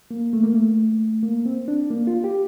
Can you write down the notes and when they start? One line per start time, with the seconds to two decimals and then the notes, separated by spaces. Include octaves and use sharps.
0.11 A#3
0.33 A3
0.44 A#3
0.54 A3
1.23 A#3
1.46 C4
1.68 D4
1.90 A#3
2.07 F4
2.24 G4